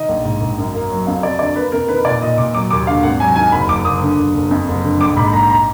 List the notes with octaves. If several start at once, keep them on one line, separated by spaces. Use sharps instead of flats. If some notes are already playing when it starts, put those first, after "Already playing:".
Already playing: D#3 D#5
A#1
G#2
G#2
F#2
A#3
F#3
F2 F5
F2 D5
D3 D5
A#3 B4
F2 A#4
D#3 B4
A#2 D5
A#2 D#5
A#2 D6
F#3 D6
D#2 D6
D3 F5
G#1 F#5
F#3 G#5
D#3 G#5
F#1 B5
F#1 D6
F#1 D#6
D3
F#1
F#1
F2
F#1
D3
A#1 D6
G#2 B5
A#1 A#5
A#5